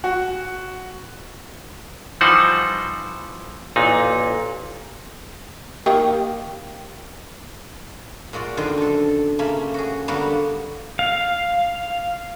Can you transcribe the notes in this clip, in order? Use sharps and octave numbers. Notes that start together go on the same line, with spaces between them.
F#4
E3 F3 G3 D#4 C5 F#5
A1 A#2 D#4
D#3 A#3 G4
A#2 G#3 F#4 D5
F#2 D3 D#3 C5 D#5 G5
D4 A4
C#3 A3 A#3 B5
F#4 G#4
D3 G3 A#3 B3 F#4 G4
F5